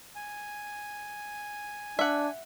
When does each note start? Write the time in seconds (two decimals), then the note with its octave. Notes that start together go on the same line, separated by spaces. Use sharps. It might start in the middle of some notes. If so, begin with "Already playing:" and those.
0.16 G#5
1.99 D4 E5 F#5